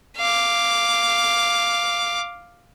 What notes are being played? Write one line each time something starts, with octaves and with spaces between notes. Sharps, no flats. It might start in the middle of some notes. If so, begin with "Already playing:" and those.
F5 D6